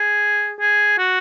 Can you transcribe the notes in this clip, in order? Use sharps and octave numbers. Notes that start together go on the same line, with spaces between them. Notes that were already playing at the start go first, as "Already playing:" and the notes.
Already playing: G#4
G#4
F#4